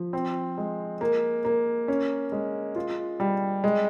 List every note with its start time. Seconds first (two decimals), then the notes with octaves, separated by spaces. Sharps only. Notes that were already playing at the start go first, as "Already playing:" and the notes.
Already playing: F3
0.13 C4
0.58 G#3
1.01 A#3
1.45 A#3
1.88 C#4
2.32 G#3
2.76 F4
3.20 G3
3.64 G#3